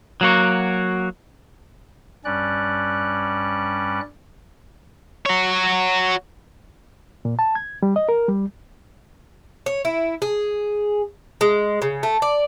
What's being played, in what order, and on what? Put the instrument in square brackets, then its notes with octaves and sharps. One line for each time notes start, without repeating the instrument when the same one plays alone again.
[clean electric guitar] F#3 A#3 F#4
[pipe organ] G2 G3 C#4 D5 F#6
[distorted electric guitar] F#4 C#5
[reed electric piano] A#2
A5
G#6
G3
D#5
A#4
G3
[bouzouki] C#5
E4
G#4
G#3
C#3
A3
D5